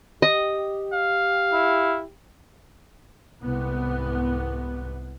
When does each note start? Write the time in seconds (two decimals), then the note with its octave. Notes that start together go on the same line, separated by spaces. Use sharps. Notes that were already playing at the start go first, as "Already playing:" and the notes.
0.22 G4 D#5
0.94 F5
1.53 E4
3.42 C2 G#2 B3